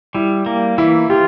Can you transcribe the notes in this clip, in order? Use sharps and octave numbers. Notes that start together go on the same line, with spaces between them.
G3 E4
A#3
E3 E4
F4 G4